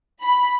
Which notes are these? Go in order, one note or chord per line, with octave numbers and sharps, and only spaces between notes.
B5